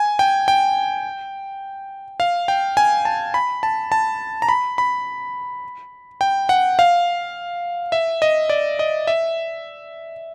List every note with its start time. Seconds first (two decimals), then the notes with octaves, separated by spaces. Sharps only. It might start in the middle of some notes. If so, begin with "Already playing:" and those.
Already playing: G#5
0.19 G5
0.48 G5
2.20 F5
2.48 G5
2.77 G#5
3.05 A5
3.34 B5
3.63 A5
3.92 A5
4.42 A#5
4.49 B5
4.78 B5
6.21 G5
6.49 F#5
6.79 F5
7.92 E5
8.22 D#5
8.50 D5
8.79 D#5
9.07 E5